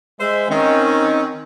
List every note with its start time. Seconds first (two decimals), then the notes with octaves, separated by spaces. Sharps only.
0.20 G#3 C5 E5
0.49 D#3 C4 C#4